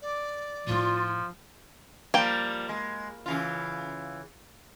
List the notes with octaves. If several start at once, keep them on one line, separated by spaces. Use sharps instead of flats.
D5
A2 F3 E4 F4
F3 G3 A#3 G5
G#3
C#3 E3 F4